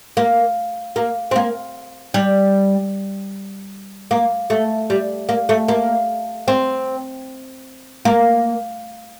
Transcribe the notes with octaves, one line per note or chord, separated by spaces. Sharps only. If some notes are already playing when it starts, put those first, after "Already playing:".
A#3
A#3
C4
A#3
G3
A#3
A3
G3
A#3
A3
A#3
C4
A#3